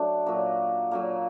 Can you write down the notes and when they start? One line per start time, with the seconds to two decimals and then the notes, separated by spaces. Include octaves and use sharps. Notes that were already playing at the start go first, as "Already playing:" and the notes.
Already playing: F#3 A3 D4
0.26 A#2 F#3 A#3
0.91 A#2 F#3 A#3